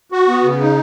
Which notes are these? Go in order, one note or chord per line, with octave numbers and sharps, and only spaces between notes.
F#4
B3
C#3
D#4